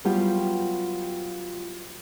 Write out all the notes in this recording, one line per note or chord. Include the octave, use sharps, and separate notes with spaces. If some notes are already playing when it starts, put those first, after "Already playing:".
F#3 G3 B3 F4 G4